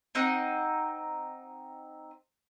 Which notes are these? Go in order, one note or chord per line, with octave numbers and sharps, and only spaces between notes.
C4 D#4 F#5